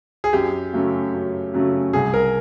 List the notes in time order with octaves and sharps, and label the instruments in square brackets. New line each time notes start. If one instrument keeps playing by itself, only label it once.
[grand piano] G#4
[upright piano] F#2 [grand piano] G4
[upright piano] C#3 F#3 A3 C#4
F#2
C#3 F#3 A3 C#4
[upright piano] C2 [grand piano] G#4
[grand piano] A#4